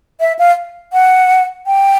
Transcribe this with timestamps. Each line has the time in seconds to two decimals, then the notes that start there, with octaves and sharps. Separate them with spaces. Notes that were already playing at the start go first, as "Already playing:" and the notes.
0.20 E5
0.39 F5
0.93 F#5
1.67 G5